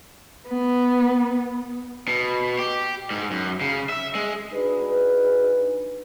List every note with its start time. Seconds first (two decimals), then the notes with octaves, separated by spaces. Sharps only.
0.49 B3
2.08 B2
2.59 G4
3.10 G#2
3.31 F#2
3.61 C#3
3.89 E5
4.15 G#3
4.54 D4 D#4 F#4 G#4 B4